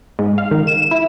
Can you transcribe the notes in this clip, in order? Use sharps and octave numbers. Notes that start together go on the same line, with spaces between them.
G#2
F5
D#3
E7
E4